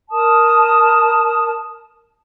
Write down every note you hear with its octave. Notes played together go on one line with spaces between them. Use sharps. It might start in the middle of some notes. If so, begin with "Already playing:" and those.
A#4 A5 D#6